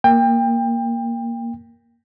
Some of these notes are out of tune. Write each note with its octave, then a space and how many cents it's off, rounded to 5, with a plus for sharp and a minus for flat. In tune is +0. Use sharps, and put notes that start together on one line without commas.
A#3 +0 G5 +25